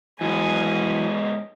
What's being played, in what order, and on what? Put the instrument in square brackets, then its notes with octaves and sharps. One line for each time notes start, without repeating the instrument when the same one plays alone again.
[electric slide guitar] G#2 B3 [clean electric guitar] E3 F#3 [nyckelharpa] G#5